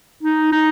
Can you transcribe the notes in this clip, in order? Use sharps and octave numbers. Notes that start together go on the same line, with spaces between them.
D#4
D#4